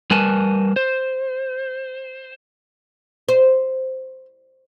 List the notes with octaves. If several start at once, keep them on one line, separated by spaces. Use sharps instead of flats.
G3 A#4 B4 G#5 A5
C5
C5